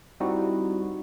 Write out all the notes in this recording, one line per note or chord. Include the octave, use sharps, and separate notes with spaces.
G3 C4 D#4 E4 F#4